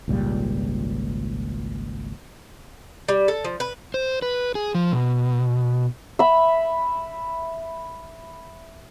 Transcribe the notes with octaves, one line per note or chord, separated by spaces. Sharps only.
G#1 C#2 A#2 G3
G3
A4
F3
B4
C5
B4
G#4
F3
B2
E5 B5